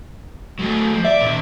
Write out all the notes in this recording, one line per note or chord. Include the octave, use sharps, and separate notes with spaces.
F#3 A3
F3
D5 E5
A#2 D#3